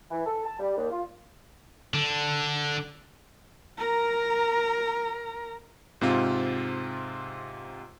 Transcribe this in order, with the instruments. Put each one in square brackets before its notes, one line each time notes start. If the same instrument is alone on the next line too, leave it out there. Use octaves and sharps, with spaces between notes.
[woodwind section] E3
A4
A5
G3
D#2
F4
[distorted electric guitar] D3 D4
[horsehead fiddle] A#4 A#5
[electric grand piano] G#2 C3 C4 F4